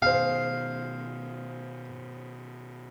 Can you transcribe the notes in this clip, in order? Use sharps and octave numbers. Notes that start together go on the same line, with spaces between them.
B2 D#3 G#4 C5 F5